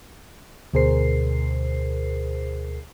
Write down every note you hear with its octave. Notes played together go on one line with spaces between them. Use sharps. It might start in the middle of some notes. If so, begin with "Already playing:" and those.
D2 B2 G#4 A#4 C5 C7